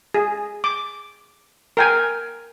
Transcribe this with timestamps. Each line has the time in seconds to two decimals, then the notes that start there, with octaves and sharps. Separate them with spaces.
0.14 G#4
0.64 D6
1.77 A#4 G5 G#5